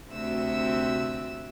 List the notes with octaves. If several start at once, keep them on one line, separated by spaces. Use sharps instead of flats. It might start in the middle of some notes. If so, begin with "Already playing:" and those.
D2 C3 C4 F#4 E5 E6